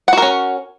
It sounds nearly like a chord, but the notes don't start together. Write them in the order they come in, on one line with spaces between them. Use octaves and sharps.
F#5 F#4 A#4 C#4